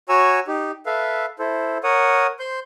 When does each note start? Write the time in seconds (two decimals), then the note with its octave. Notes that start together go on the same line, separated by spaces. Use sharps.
0.09 F#4 C#5 G#5 A#5 E6
0.47 D#4 G4
0.86 A4 B4 E5 F5
1.39 E4 A4 C5
1.84 A#4 C#5 F#5 D#6
2.39 C5 C6 G6